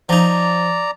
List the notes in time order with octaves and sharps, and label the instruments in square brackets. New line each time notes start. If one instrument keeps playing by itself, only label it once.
[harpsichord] F3 D#4 [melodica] D5 A#5